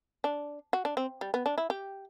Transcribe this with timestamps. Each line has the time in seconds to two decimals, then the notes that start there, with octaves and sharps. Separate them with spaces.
0.24 D4
0.73 F#4
0.85 D4
0.97 C4
1.21 G3
1.34 B3
1.46 D4
1.58 E4
1.70 G4